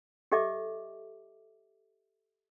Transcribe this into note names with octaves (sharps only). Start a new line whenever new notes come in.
G4 A4 D#5 E5 D6